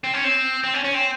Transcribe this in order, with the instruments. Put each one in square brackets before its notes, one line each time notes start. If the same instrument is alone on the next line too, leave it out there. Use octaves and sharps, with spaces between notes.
[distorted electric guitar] C4
C#4
C4
C4
C#4
C#4
C4